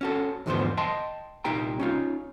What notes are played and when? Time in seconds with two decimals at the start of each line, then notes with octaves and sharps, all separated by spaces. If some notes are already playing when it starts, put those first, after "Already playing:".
0.01 C#4 F#4 A4
0.46 E2 G#2 D3 F3 B3 C5
0.77 D#5 G5 A5 C6
1.44 C2 A#2 D#4 G4 G5 A#5
1.80 C#4 D#4 F4